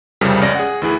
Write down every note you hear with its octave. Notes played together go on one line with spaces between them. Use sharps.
C2 F2 C#3 F3 G3 A#4
C#2 C#4 D5 A#6
G#4 F#5
D2 E3 E4 G#4